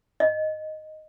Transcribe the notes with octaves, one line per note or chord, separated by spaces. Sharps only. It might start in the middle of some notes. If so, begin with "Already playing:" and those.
D#5